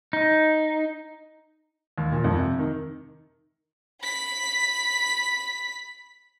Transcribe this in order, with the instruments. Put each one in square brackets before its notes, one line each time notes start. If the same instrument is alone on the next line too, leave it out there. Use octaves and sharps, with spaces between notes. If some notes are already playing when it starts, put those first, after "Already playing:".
[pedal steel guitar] D#4
[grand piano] D#2
A#2
F2
C3
D#3
[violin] B5 B6